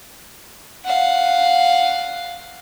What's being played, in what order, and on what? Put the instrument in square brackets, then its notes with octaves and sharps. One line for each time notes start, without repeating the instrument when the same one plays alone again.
[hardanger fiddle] F5 F#5